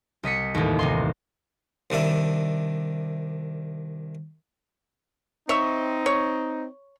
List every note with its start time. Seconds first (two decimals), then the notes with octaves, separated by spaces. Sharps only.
0.23 C2 D#5 B6 C#7
0.55 A1 D#2
0.79 C3 D#4 C6
1.90 C2 D#3 D4 E5
5.49 C4 D#4 C#5 E5
6.06 C#5